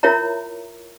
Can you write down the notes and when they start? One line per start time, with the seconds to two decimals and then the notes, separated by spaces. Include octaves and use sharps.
0.03 E4 F4 A#4 C#5 E5 A#5